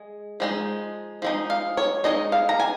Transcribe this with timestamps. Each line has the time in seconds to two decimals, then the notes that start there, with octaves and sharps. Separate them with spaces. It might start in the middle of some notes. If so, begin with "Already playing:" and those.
Already playing: G#3
0.40 F3 G#3 D#4
1.22 F3 G#3 D#4
1.50 F5
1.77 C#5
2.04 G#3 D#4 D#5
2.32 F5
2.49 A#5
2.60 G#5